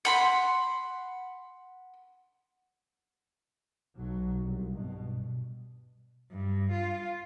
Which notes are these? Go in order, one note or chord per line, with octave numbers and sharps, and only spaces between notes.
F#5 B5 C6
B1 F#3
C2
G2 B2
G2
F4